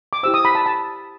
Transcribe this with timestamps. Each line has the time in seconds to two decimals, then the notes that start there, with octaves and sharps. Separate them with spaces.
0.13 D6
0.23 E4 G4 C5 E6
0.34 D#6
0.45 B5
0.55 A5
0.66 A5